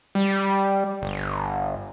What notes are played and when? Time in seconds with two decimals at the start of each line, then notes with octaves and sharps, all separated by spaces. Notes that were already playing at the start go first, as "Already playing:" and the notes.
0.15 G3
1.02 G1